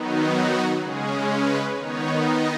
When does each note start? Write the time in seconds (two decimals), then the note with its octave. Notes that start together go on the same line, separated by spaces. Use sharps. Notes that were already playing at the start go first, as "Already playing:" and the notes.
Already playing: D#3 F#3 B3 D#4
0.32 F#4
0.80 C#3 G#3 C#4 G#4
1.28 B4
1.75 D#3 B3 D#4 C#5
2.23 D#5